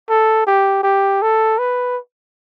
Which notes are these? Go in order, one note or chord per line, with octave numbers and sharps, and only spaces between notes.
A4
G4
G4
A4
B4